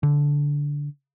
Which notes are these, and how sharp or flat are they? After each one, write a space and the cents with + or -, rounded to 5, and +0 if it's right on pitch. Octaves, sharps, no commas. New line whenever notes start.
D3 -15